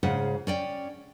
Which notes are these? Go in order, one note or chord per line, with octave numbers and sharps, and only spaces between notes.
G#2 C#3 F4 F#5
C#4 D5 G5